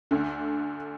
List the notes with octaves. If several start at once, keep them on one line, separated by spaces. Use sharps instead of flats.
D2 D3